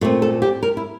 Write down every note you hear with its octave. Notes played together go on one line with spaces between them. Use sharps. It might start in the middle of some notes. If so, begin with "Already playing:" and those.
A#2 A3 C4
A4
G4
A#4
E4